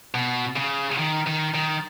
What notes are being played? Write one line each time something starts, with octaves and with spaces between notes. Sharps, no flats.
B2
C#3
D#3
D#3
D#3